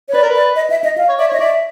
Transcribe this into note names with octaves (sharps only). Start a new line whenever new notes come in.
C#5
B4 D5
A#4
B4
D5
D#5
E5
D#5
F5
C#5
D5 E5
C#5
D#5
D5 E5